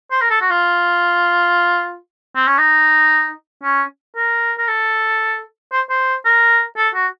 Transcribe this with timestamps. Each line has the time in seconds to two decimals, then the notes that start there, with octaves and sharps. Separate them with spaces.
0.11 C5
0.21 A#4
0.30 A4
0.41 F#4
0.50 F4
2.36 C4
2.47 C#4
2.59 D#4
3.64 C#4
4.16 A#4
4.58 A#4
4.68 A4
5.72 C5
5.90 C5
6.25 A#4
6.77 A4
6.94 F#4